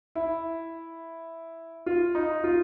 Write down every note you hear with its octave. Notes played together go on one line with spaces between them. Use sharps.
E4
F4
D#4
F4